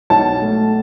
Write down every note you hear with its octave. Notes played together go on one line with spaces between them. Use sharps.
B1 A5
A3